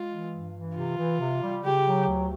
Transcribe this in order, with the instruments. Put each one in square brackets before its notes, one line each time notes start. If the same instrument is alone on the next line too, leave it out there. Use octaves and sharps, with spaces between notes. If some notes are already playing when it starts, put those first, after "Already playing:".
Already playing: [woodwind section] G#3 [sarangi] F4
[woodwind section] E3
G2
E3
[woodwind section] C3 [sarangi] F4
[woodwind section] E3
C3
G3
[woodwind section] C#3 [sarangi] G4
[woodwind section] F#3
D2